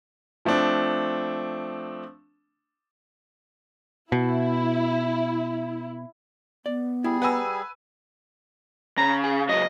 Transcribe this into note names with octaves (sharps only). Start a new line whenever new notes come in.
F3 A3 C4 D4
B2 E4
B3 D5
G3 E4 G#4
B4 F#5 G#5 A#5 E6
C#3 A#5
G#4
C#2 F#3 D#5